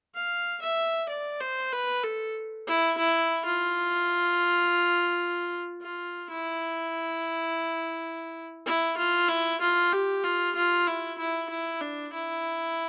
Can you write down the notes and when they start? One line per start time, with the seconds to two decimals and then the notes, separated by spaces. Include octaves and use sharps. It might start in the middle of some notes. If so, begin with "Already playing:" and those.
0.15 F5
0.62 E5
1.09 D5
1.41 C5
1.73 B4
2.03 A4
2.67 E4
2.98 E4
3.45 F4
5.82 F4
6.30 E4
8.66 E4
8.97 F4
9.29 E4
9.61 F4
9.92 G4
10.24 F4
10.56 F4
10.87 E4
11.18 E4
11.50 E4
11.81 D4
12.13 E4